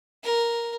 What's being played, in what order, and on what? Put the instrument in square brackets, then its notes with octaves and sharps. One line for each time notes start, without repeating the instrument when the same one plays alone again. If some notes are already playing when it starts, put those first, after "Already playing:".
[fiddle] A#4